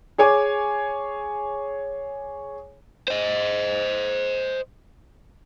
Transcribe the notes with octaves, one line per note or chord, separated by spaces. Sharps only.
G#4 C#5 G#5 D6
C5 D#5